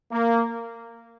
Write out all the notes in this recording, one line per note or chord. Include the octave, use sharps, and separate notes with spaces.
A#3